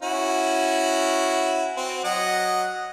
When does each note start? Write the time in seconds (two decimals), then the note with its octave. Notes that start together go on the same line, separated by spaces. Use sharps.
0.02 C#4 E4 F#4
1.77 C4 F#4
2.04 F#3 D#5 F#5